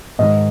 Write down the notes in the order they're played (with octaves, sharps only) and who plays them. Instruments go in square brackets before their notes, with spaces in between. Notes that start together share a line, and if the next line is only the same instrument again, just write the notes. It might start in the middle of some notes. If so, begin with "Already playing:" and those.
[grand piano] G#2 D#3 G#3 D#5